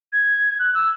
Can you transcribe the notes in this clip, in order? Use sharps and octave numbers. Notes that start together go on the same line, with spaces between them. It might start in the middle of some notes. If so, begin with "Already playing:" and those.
G#6
F#6
E6